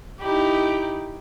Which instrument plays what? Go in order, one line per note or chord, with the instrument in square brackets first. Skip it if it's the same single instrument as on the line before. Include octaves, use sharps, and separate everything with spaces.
[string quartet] D#4 E4 G4